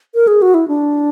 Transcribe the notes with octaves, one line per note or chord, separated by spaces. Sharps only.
A#4
G#4
F#4
E4
D4